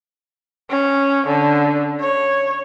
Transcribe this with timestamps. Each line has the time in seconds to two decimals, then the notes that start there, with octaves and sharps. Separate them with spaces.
0.70 C#4
1.27 D3
2.01 C#5